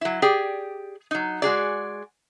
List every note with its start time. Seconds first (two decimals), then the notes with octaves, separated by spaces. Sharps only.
0.01 F#3 E4
0.22 G4 G#4 D5 G5
1.11 F#3 D#4
1.42 G#3 F#4 G#4 D5